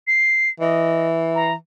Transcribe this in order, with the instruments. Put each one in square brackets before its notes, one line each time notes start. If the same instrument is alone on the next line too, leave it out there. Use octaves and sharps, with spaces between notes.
[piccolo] C7
[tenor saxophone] E3 [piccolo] D#5
[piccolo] A#5